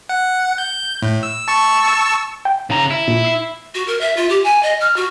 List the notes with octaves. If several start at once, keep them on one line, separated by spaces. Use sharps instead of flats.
F#5
G6
A2
E6
A5 C#6 E6
G5
C#3 A#5
E4
A#2
E6 C7
F#4
A#4
E5
F4
G4
G#5
D#5
F6
F#4